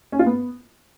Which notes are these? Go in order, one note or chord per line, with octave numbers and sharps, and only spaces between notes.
C#4
F4
B3